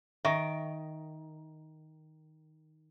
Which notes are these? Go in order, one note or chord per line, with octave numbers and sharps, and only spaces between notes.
D#3 E5 C#6